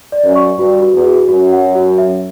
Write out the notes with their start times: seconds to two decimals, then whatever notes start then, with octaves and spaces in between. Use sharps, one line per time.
0.12 D5
0.24 F#2
0.35 C#6
0.58 G2 F#4
0.82 F#4
0.93 E2
1.06 F#4
1.28 F#2 F#4
1.52 F#5
1.75 F#4
1.98 E5